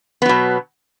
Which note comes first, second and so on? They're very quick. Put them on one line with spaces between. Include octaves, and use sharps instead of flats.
B3 F#3 B2